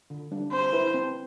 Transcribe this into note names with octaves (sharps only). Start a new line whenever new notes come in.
D3
G3 D4
C4 C5
E4 B4
C4